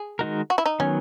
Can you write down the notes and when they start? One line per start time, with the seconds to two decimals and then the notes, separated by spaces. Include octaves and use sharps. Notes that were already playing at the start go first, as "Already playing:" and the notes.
Already playing: G#4
0.19 D#3 G#3 D#4 F#4 A#4
0.50 F#4
0.58 E4
0.66 D#4
0.80 D#3 F#3 B3 C#4